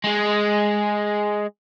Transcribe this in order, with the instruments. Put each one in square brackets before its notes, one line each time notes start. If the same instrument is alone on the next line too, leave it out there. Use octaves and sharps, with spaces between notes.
[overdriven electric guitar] G#3 G#4